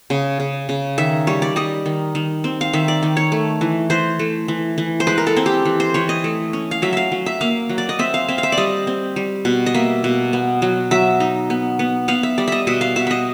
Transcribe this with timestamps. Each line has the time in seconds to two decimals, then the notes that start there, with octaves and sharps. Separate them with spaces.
0.10 C#3
0.40 C#3
0.69 C#3
0.98 D#3 E5
1.27 G3 C#5
1.42 D5
1.56 G3 D#5
1.86 D#3
2.15 D#3
2.44 C4
2.61 F5
2.73 D#3 E5
2.88 D5
3.03 D#3
3.17 C#5
3.32 A3
3.61 E3
3.90 E3 C5
4.19 A3
4.48 E3
4.78 E3
5.00 C5
5.07 G#3 B4
5.18 A#4
5.27 A4
5.37 C4
5.46 G4
5.65 E3
5.80 C5
5.94 E3 C#5
6.09 D#5
6.24 A3
6.53 C#4
6.71 F5
6.82 F#3 E5
6.93 E5 F5
7.12 F#3
7.26 E5
7.41 A#3 F5
7.69 F#3
7.78 D5
7.89 D#5
7.99 C4 E5
8.14 F5
8.28 C4 E5
8.38 F5
8.43 E5
8.52 D5
8.57 G3 D#5
8.87 C4
9.16 G3
9.45 B2
9.66 D#5
9.74 A#3 E5
10.04 B2
10.33 B3
10.62 F#3
10.91 F#3 E5
11.20 D#4
11.50 B3
11.79 B3
12.08 B3 F5
12.23 E5
12.38 G3 D5
12.48 D#5 E5
12.67 B2 E5
12.81 F5
12.96 B2 E5
13.07 D#5 E5